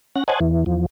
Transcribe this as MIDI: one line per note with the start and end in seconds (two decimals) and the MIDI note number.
0.16 0.24 61
0.16 0.24 78
0.16 0.24 94
0.28 0.40 72
0.28 0.40 73
0.28 0.40 75
0.28 0.40 78
0.28 0.40 80
0.28 0.40 81
0.40 0.64 40
0.40 0.64 52
0.66 0.86 40
0.66 0.86 53